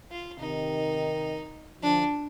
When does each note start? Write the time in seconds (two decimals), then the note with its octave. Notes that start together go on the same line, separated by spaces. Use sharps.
0.11 F4
0.39 C3 D#3 D#4
1.82 D3 F3 D4